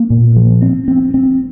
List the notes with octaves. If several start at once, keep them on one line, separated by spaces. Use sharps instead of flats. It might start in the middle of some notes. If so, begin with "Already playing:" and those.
Already playing: A#3
A#2
F3
C4
C4
C4